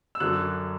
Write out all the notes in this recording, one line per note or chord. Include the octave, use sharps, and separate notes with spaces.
E6
F#2 D3 F#3 F#6